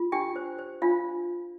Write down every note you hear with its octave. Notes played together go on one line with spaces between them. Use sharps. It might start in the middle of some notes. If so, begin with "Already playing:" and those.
Already playing: F4
D4 G4 G5
C5
C5
D4 F4 F5